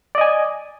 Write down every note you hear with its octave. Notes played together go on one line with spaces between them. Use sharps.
D5 D#5 G#5